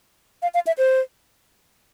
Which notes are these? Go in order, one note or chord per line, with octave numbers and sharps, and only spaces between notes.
F5
F5
E5
C5